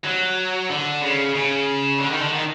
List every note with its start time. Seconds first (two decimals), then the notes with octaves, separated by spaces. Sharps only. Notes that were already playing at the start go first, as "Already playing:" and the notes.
0.05 F#3
0.70 D3
1.02 C#3
1.35 C#3
1.99 D3
2.11 D#3
2.22 D3
2.32 D#3